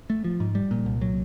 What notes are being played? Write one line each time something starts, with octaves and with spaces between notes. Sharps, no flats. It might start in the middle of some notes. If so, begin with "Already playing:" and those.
A3
F3
G#2
G3
A#2
C2
F#3